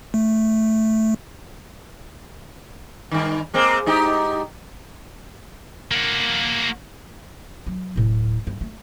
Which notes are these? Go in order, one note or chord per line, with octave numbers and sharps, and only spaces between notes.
A3
G2 D#3
G#3 A#3 C4
G#2 D#4 G4
A#3 F#4
F#3
D1 A2
G2
A3